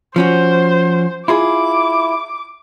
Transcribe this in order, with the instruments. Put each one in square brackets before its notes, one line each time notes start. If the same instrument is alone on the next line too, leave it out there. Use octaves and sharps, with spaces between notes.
[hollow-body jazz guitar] F3 C#4 F#4 [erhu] C5
[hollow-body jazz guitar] E4 F4 G#4 [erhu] D6